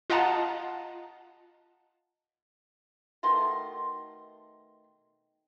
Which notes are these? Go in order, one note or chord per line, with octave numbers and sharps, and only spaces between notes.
F4 D#5 F5 F#5 A5 A#5
B2 D#3 A3 C6